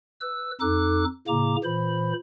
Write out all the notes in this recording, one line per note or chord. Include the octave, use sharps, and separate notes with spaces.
B4 E6
F2 D#4 A4 D6 F#6
A2 C#3 A#3 A#5 D6
A#2 E3 C5 B5